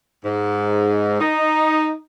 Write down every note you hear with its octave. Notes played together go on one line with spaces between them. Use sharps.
G#2
D#4